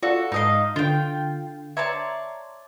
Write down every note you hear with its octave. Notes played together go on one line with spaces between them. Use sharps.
F4 F#4 A4 D5
G#2 D#4 D#5 F5
D3 F4 G5
C#5 D5 E5 A5 A#5 C6